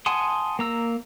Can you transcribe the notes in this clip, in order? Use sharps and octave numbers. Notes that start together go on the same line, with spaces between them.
F#5 G#5 A5 C6 D#6
A#3 A#5 E6